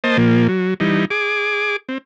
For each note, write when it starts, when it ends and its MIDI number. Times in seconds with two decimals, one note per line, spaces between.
0.04 0.17 58
0.04 0.17 72
0.04 0.17 75
0.04 0.17 81
0.17 0.47 46
0.17 0.47 53
0.17 0.47 58
0.48 0.74 54
0.80 1.05 52
0.80 1.05 55
0.80 1.05 63
1.10 1.76 68
1.10 1.76 86
1.89 1.98 60